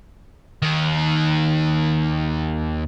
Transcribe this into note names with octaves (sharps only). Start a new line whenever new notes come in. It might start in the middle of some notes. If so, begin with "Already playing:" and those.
D#2 D#3